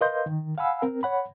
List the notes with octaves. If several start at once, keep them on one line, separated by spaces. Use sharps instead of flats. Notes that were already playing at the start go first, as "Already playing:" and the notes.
A#4 B4 D#5 F5 C6 G6
D#3
F5 F#5 G#5 B5 E6
C4 A#4
C#5 F#5 B5